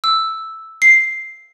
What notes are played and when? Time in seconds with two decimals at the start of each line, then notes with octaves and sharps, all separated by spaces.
0.04 E6
0.82 C7